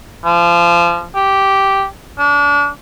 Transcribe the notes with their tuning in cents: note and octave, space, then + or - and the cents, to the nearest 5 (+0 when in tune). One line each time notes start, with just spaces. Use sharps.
F3 -25
G4 -10
D4 -30